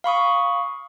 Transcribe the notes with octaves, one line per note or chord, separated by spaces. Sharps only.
F5 B5 C#6 D#6